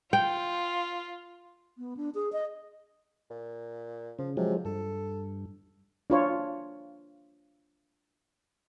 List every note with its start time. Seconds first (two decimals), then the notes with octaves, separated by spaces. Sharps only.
0.13 F4 G5
1.78 B3
1.97 D4
2.15 G#4
2.33 D#5
3.30 A#2
4.19 C#3 F3
4.37 C3 F3 F#3 G#3
4.65 G2 A4
6.10 D4 F4 C#5